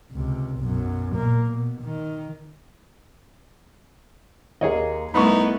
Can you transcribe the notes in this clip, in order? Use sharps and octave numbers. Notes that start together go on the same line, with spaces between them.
C#2 C3
B1 F#2
A#2 A#3
B2
D#3
D#2 A#3 G#4 C#5 D#5
C2 A3 B3 D#4 E4 B4 B5 C#6